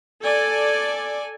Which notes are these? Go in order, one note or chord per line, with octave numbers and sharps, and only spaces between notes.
A4 D5 G#5